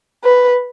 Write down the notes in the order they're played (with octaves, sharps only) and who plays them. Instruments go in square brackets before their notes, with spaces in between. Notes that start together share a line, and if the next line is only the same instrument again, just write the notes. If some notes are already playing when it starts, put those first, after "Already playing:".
[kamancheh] B4